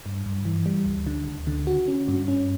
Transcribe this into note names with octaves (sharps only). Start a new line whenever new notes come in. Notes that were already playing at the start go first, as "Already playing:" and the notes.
G2
G2
E3
G3
D2
D3
D2
D3
F#4
C#4
G2
C#4